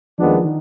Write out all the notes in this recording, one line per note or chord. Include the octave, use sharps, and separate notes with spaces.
D#2 D#3 F3 G#3 B3 D4
D#3